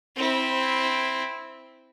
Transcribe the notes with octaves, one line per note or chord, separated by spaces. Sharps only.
C4 E4